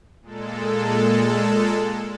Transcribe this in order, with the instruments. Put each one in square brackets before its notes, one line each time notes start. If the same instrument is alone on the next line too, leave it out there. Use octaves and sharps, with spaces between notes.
[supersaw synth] A#2 G#3 A4